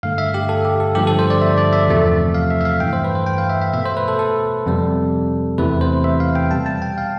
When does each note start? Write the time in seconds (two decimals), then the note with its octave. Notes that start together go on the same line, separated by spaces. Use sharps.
0.03 G2 D3 A3 F5
0.18 E5
0.34 G4
0.49 A4
0.65 G4
0.80 A4
0.95 G2 D3 F3 A3 G4
1.07 A4
1.19 C5
1.30 D5
1.42 E5
1.58 D5
1.73 E5
1.88 E2 C3 F3 A3
2.34 F5
2.51 E5
2.61 E5
2.65 F5
2.80 G2 E3 A3 G5
2.93 C5
3.04 B4
3.15 C5
3.26 G5
3.38 F5
3.50 E5
3.62 E5
3.73 B2 A3 E5
3.85 C5
3.97 B4
4.08 A4
4.19 A4
4.66 F2 C3 G3
5.58 E2 C3 E3 A3 B4
5.81 C5
6.04 E5
6.20 F5
6.35 G5
6.51 B2 G3 A5
6.66 A5
6.82 G5
6.98 F5